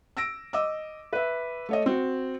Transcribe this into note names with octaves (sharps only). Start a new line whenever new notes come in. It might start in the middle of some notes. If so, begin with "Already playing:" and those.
E6 A#6 D7
D#5 D6 E6
B4 E5
A3 C#5 D#5
C4 F#4